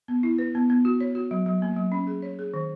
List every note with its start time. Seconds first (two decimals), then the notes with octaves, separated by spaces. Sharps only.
0.08 B3
0.23 E4
0.38 B4
0.55 B3
0.70 B3
0.85 F#4
1.00 C#5
1.15 F#4
1.31 F#3
1.46 F#3
1.62 A#3
1.77 F#3
1.92 C#4
2.07 G#4
2.22 C#5
2.39 G#4
2.54 D#3